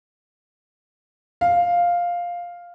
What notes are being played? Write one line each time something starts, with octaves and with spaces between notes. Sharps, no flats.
F5